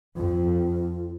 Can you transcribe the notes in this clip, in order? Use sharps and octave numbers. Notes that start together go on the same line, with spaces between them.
F2 F4